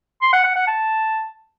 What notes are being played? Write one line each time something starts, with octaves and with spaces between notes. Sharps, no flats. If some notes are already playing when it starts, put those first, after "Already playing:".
C6
F#5
F#5
F#5
A5